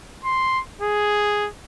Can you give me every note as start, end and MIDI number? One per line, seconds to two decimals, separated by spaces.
0.25 0.60 84
0.81 1.48 68